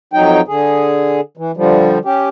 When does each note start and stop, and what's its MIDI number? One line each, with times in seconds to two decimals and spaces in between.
0.13 0.41 41
0.13 0.41 54
0.13 0.41 63
0.13 0.41 79
0.48 1.21 50
0.48 1.21 68
1.37 1.52 52
1.57 1.99 50
1.57 1.99 53
1.57 1.99 55
2.05 2.29 61
2.05 2.29 67